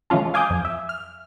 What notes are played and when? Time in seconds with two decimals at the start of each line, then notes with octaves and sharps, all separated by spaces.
0.10 E3 G#3 C#4 F4 A4
0.34 F5 G#5 D6 D#6 G6
0.50 F2
0.65 E5
0.89 F6